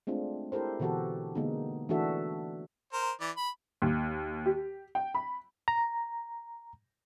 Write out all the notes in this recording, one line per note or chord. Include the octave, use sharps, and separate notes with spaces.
G#3 A3 C4 D4 F4
E4 G4 A4 A#4 C5
B2 D3 E3 F#4 G4 A4
D3 G#3 A#3 B3 D#4
E3 A3 D4 F#4 A4 E5
A#4 C5
E3 D5
B5
D#2
G4
G5
B5
A#5